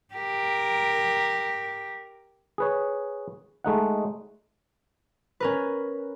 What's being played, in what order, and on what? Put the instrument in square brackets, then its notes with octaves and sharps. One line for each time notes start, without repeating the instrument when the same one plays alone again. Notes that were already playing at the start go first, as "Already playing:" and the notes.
[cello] G4 A#4
[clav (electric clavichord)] G#4 B4 C#5
G#3 A3 D#4 F#5
[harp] C#4 A#4 B4